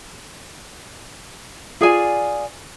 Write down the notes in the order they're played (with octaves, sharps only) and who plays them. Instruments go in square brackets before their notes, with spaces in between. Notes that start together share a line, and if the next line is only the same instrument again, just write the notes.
[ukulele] F4 G#4 D5 G#5